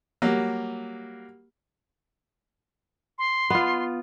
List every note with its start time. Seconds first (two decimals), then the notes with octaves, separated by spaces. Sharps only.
0.22 F#3 G3 A#3
3.18 C6
3.50 B3 F4